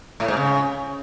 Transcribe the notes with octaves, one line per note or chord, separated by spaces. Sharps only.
A2
G#2
C#3